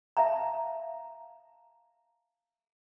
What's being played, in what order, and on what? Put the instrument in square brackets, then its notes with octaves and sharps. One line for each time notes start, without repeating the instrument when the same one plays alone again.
[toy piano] E5 F5 A5 A#5